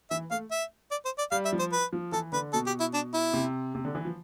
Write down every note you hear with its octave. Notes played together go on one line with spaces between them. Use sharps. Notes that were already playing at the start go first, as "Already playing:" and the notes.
E3 E5
A3 F5
E5
D5
C5
D5
G3 F5
E5
F3
C5
B4
F3
E3 A4
D3 B4
B2 A4
G4
E4
D4
E4
C3
C3
D3
E3
F3